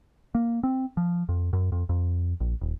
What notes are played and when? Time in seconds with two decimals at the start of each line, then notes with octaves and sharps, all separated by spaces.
0.35 A#3
0.63 C4
0.97 F3
1.29 F2
1.53 F#2
1.72 F2
1.89 F2
2.40 A#1
2.61 D#1